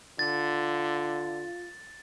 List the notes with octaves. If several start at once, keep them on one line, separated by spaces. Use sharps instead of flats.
D3 F4 A6